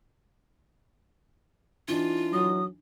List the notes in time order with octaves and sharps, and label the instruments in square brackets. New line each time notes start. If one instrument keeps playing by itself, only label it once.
[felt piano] E3 D4 D#4 [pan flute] F4
[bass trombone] F#3 [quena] D#6